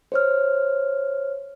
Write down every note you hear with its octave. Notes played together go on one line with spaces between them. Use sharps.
C5 C#5 F6